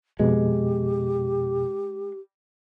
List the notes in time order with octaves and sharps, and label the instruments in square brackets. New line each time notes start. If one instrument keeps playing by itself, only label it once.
[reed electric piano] F2 B2 [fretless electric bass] G#3 [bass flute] G4